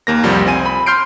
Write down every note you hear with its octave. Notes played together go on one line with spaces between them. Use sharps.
D#2 A#3 A#6
C2 F2 F3 G3
C2 C4 G#5 D#7
B5
C6 F6 G6 C7 D7